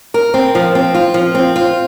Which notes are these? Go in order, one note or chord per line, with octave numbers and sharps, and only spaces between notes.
A#4
C4
F3
C4
F4
F3
C4
F4